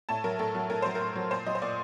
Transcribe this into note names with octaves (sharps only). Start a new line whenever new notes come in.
A2 A5
F#3 A#4
A2 A4
F#3
A2 A#4
F#3 C5
A#4
A2
F#3
A#2 C5
F#3 D#5
C5
A#2 D5